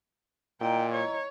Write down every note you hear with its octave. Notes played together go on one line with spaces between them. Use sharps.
A#2 E4 D#5 G5 A#5
C#5